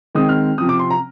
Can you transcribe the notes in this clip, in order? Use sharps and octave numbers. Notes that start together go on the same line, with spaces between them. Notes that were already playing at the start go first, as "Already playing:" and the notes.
D#3 G#3 C4 D#6
F6
C3 F3 C4 D#6
D6
C6
A#5